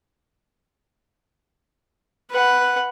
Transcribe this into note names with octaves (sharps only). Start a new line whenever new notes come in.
B4 F#5